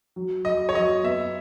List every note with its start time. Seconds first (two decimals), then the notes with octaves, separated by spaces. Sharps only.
0.16 F#3
0.45 F#3 D#5
0.69 C#5
0.75 F#3 D#5
1.04 B3 E5